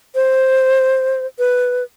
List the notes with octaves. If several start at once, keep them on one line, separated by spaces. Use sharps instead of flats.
C5
B4